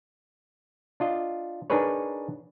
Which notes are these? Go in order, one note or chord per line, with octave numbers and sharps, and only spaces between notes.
D4 F4 D#5
D4 D#4 G#4 A#4 B4 C#5